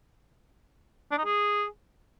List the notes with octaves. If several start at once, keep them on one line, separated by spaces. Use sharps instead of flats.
D4
D#4
G#4